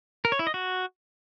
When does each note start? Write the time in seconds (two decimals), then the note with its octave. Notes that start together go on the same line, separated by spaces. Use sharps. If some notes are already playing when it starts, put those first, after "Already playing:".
0.25 A#4
0.32 C#5
0.39 E4
0.47 D#5
0.54 F#4